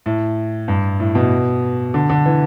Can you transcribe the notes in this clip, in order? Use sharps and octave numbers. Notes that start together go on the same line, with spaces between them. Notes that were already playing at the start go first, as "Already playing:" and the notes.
A2
G2
A2
B2
D3
D3
E3